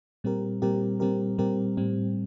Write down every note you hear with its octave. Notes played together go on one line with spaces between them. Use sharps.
A#2 G3 C4 G4 A#4
A#2 G3 C4 G4 A#4
A#2 G3 C4 G4 A#4
A#2 G3 C4 G4 A#4
A2 G3 C4